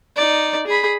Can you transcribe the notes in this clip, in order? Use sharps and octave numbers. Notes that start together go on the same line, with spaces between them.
D#4 D5
G#4 B5